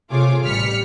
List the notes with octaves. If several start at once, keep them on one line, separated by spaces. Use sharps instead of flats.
C3 A3 F4 G#4 C#5 D6
A1 G3 F6 B6 C#7